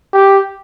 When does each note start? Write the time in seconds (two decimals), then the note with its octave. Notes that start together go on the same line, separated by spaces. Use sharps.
0.13 G4